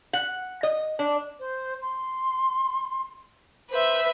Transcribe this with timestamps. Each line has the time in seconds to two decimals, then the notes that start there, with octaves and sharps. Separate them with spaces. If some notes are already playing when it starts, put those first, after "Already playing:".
0.13 F#5
0.63 D#5
0.99 D4
1.40 C5
1.82 C6
3.70 B4 C5 E5